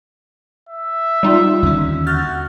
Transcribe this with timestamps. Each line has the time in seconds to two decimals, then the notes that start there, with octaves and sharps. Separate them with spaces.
0.69 E5
1.23 G3 D#4 F4
1.63 D#2 D3 C#4
2.07 F#4 F6 G6 A6